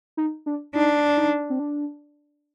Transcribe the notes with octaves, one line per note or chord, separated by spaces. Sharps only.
D#4
D4
D4 D#4
D#4
C4
D4